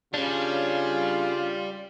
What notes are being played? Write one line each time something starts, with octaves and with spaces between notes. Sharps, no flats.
C#3 G3 C#4 D4 F4